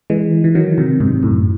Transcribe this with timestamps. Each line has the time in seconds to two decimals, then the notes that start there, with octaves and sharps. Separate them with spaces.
0.10 E3 G#3
0.44 E3
0.55 D#3 F#3
0.78 C3 D#3
1.00 G#2 C3
1.23 F#2 A2